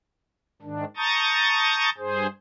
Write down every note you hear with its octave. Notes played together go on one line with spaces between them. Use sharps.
G#2 D#3 D4
A5 A#5 C#6 D#6 G6 A6
G2 G#4 C5